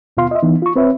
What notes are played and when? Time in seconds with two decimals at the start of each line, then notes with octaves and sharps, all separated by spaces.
0.17 D#2 B2 B3 F4 F5 C6
0.31 D#5 E5
0.43 E3 B3 D#4
0.62 F4 C#6
0.76 C4 B4 C#5 E5